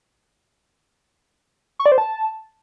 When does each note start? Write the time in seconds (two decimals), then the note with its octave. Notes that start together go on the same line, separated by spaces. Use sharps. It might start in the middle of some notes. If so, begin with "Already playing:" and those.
1.79 C#6
1.86 D5
1.92 C5
1.98 A5